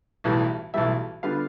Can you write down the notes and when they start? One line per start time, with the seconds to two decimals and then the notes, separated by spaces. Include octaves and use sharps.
0.24 B1 A2 E3 G3
0.74 B1 A2 E3 G3 E5
1.23 D3 G3 B3 F4 F5